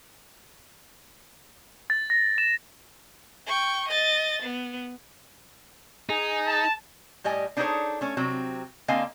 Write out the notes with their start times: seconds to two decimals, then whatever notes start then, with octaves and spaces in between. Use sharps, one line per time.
1.90 A6
2.10 A#6
2.38 E7
3.47 G5 C#6
3.89 D#5 A6
4.43 B3
6.09 D#4 G#4
6.47 A5
7.24 A2 G3 D#5 G#5
7.57 D4 D#4 G#4 A4 C5 C#5
8.01 A3 C#4
8.17 C3 F#3 C4
8.88 D3 A#3 C4 D#5 F5 G#5